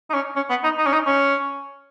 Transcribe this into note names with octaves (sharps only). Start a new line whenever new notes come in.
D#4
C#4
C#4
B3
D#4
D#4
C#4
D#4
C#4